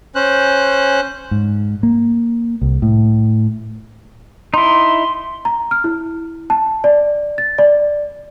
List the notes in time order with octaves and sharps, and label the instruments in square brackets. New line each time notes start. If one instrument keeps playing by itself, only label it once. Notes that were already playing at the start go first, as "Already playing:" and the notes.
[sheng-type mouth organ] C#4 C5 F#6
[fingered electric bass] G#2
A#3
C2
A2
[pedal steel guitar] D#4 E4 [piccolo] C6
[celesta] A#5
F6
E4
A5
D5
A6
D5